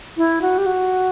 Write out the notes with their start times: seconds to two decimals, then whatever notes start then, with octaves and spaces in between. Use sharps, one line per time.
0.17 E4
0.42 F#4
0.58 G4
0.66 F#4